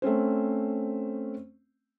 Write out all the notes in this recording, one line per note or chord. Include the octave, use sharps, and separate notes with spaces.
A3 C4 C#4 C5